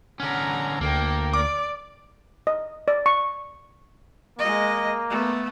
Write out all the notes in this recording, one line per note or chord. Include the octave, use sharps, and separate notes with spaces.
D3 C#4 F#5 A#5
D2 A#3 A4 G5
D5 D6
D#5
D5
C#6
G#3 A#3 D#5
A3 B3